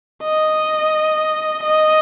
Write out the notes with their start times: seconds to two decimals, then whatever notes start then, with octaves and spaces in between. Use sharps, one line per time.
0.23 D#5
1.63 D#5